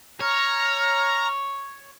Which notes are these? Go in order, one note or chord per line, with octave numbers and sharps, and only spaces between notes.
C#5 A#5 F6